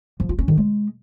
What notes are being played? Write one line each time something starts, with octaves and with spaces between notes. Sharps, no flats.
F3
F4
C#4
D#3
G#3